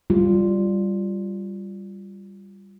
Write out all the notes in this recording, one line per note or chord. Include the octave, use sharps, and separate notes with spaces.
G3 F4